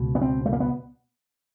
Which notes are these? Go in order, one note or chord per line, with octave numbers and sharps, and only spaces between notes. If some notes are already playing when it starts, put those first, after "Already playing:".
Already playing: C#2 B2
B3
C4
A3
A#3
B3